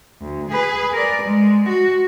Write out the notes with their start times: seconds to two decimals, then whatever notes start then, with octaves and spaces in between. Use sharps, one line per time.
0.22 D2
0.51 G#4 B4
0.92 A#4 D5
1.22 G#3
1.68 F#4